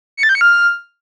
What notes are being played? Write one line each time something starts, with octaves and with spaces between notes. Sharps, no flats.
C#7
A6
G6
C#7
F6